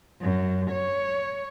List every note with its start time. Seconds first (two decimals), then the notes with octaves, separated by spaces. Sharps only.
0.22 F#2
0.72 C#5